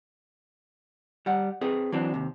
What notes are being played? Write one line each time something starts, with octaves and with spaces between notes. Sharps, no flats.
G3 F#5
C4 G#4 B4
E3 F#3 C4 D4
D#2 C3